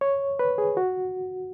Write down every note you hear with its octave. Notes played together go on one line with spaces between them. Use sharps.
C#5
B4
G#4
F#4